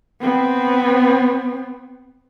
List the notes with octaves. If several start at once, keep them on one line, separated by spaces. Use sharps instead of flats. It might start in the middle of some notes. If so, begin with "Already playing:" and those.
B3 C4